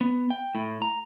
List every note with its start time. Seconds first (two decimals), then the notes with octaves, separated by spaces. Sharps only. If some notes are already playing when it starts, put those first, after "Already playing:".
0.01 B3
0.30 G5
0.55 A2
0.82 A#5